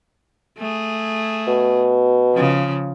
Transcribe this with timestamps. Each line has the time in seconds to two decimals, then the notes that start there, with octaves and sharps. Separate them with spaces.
0.58 A3 G#4
1.47 B2
2.34 C#3 F3